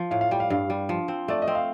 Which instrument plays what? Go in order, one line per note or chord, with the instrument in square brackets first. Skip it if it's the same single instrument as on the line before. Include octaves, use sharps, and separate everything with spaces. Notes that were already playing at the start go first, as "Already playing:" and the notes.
Already playing: [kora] F3
[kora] A2 [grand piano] F5
[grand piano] F5
[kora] G3 [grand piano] G5
[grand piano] F5
[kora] G2 [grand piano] F5
[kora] G3
F3
C4
[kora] A3 [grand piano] D5
[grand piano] D#5
[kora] C4
[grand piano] F5